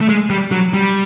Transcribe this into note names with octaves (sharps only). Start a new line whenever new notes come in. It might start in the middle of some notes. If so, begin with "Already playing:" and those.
A3
G#3
G3
F#3
G3